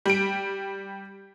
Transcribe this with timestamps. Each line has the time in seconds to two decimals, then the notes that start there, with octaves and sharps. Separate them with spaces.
0.06 G3 D7